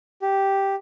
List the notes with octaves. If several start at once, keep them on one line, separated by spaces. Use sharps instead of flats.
G4